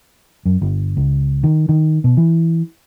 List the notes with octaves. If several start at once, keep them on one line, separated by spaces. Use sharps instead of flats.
F#2
G1
C#2
D#3
D#3
B2
E3